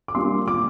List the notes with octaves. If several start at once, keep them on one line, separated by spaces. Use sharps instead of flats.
D6
G3 A#3 D4 F4 C6
A#2 D6